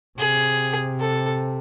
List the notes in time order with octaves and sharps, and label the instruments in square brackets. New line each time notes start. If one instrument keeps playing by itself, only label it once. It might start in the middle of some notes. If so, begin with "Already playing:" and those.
[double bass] C3 [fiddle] G#4
[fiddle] A4